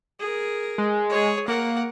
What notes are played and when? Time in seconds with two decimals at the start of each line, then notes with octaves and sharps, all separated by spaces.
0.20 G#4 A#4
0.78 G#3
1.09 G#4 C#5
1.48 A#3 A#4 F#5